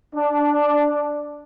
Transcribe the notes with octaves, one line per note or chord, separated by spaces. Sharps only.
D4